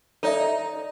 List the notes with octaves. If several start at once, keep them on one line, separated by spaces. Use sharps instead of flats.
D#4 A4 D5 E5